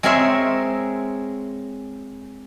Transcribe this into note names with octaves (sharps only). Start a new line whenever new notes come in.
G#3 C4 G#4 A#4 C#5 E5